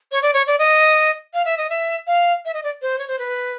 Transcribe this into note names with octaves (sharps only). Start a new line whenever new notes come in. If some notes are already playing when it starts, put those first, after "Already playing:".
C#5
D5
C#5
D5
D#5
F5
E5
D#5
E5
F5
E5
D#5
D5
C5
C#5
C5
B4